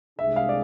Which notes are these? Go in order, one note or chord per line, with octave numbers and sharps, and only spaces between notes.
C2 C3 G#3 D4 G#4 E5
F5
D5